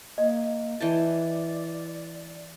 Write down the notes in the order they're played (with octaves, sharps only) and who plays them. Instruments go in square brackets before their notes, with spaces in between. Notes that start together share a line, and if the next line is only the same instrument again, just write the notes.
[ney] A#3 [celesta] D#5
[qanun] E3 G5 A5 [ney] D5